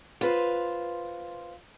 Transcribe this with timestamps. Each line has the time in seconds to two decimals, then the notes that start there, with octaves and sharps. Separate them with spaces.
0.21 F4 B4 C5